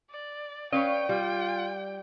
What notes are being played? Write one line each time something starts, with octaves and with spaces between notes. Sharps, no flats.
D5
C#4 B4 C#5 D5 F5 G5
G3 F4